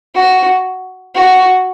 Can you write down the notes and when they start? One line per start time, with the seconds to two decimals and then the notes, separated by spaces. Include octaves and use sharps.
0.15 F#4
1.15 F#4